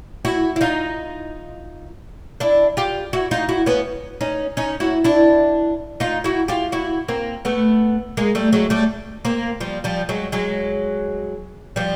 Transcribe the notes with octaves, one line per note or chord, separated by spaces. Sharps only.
E4 F#4
E4
D#4 F4
D4 E4
F4 G4
E4 F#4
D#4 F4
E4 F#4
B3 C#4
C#4 D#4
C#4 D#4
E4 F#4
D4 E4
D#4 F4
E4 F#4
F4 G4
E4 F#4
A#3 C4
A3 B3
G#3 A#3
G3 A3
F#3 G#3
G3 A3
A#3 C4
F3 G3
F3 G3
F#3 G#3
F#3 G#3
F3 G3